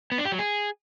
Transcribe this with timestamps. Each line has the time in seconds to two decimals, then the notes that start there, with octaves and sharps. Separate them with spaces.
0.12 B3
0.18 D4
0.25 G4
0.32 F#3
0.39 G#4